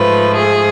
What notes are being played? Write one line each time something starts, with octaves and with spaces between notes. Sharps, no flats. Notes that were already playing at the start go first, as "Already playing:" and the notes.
Already playing: G#2 F3 A3 B4
G#4